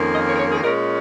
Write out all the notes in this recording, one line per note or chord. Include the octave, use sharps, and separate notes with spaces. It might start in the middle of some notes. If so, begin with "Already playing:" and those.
Already playing: F2 D#3 A#3 C#4
D#5
C#5
A#4
C#5
G#4
A#2 G#3 C#4 A#4